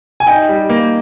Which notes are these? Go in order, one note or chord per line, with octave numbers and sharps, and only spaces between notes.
G#5
D#4 G5
G3
A#3